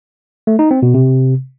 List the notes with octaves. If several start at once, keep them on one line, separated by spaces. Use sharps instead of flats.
A3
D#4
C4
B2
C3